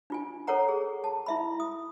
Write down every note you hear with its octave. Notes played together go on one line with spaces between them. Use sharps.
D4 F4 G#5
A4 A#4 C#5 D5 F#5 A#5
G#4
A5
E4 E5 B5
D#6